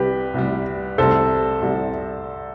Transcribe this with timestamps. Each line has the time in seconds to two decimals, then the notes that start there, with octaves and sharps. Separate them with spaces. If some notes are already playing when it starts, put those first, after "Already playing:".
Already playing: C2 C3 G3 G4 B4
0.34 C2 C3 G3
0.98 C2 C3 G3 A4 C5
1.62 C2 C3 G3